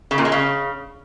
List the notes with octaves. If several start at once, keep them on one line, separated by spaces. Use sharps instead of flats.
C#3
A#2
G#3
C#3